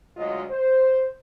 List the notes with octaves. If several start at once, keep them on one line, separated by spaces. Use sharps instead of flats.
D2 F#3 G#3 F4 D#5
C5